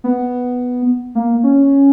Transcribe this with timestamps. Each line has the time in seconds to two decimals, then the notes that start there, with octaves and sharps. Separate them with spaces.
0.04 B3
1.15 A#3
1.43 C#4